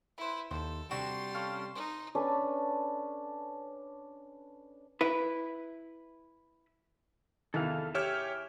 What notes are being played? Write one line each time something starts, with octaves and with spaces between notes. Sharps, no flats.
E4 B4 C5 B5
D#2 A4 C5
C3 G3 D4 F#4 C6 E7
C#4 A4 F5
D#4 C5
C#4 D4 A4 B4
E4 B4
E2 C3 D#3 E3 A4 F5
G4 C#5 E5 G5 G#5 F6